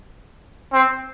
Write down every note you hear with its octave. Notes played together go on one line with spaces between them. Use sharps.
C4